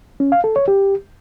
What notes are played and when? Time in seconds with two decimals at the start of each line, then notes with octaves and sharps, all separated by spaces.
0.20 C#4
0.32 F5
0.44 A4
0.56 C#5
0.68 G4